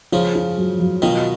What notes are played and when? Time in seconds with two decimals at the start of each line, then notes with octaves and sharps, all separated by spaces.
0.12 C#3 F3 F4
0.35 F4
0.58 F#3
0.80 F#3
1.02 B2 D#3 F4